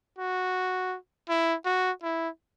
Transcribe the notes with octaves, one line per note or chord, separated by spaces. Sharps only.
F#4
E4
F#4
E4